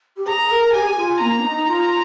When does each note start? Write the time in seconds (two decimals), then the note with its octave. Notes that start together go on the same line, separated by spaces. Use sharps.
0.16 G4
0.27 G#4 A#5
0.51 A#4
0.73 G4 G#5
0.81 G#4
0.88 G4
0.96 F4
1.20 A#3 A#5
1.39 D4
1.44 D#4
1.68 F4